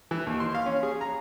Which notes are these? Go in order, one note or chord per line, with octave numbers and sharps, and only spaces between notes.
E3
D#2
C6
F5
C#4
G#4
A#5